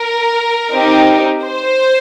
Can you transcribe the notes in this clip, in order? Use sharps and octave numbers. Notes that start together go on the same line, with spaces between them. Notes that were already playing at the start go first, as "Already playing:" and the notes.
Already playing: A#4
C4 D#4 G4
C5